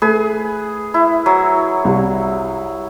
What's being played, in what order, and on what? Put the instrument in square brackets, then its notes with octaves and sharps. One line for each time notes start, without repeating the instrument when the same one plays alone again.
[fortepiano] A3 [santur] G#4 B4
[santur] E4
F#3
[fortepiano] C2